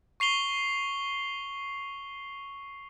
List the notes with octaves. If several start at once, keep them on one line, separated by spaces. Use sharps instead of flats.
C#6 C7 F7 G7